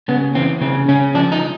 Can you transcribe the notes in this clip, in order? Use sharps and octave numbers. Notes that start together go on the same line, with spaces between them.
C#3 B3
E3 C4
C#3 C4
C#3 C#4
F3 D4
D#4